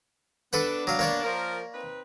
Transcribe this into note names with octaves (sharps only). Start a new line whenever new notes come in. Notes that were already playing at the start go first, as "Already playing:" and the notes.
G3 B3 D4 A4 B4 F#5
F#3 F5
A#3 C#5 D5
F3 A#4
C4 D#4 B4